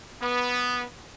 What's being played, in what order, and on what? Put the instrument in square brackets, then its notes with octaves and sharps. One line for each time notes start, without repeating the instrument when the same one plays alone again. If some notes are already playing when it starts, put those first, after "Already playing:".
[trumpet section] B3